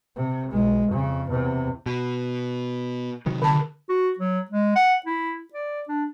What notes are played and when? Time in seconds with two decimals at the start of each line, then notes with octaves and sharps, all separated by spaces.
0.16 C3
0.51 B1 G#3
0.88 F2 C#3
1.28 E2 C3
1.86 B2
3.26 C3 D#3 F#3
3.42 D3 A5
3.89 F#4
4.19 F#3
4.51 G#3
4.76 F#5
5.06 E4
5.53 D5
5.88 D4